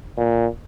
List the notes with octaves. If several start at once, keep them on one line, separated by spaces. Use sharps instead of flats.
A#2